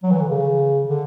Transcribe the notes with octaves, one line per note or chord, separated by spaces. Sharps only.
F#3
E3
D3
C#3
D3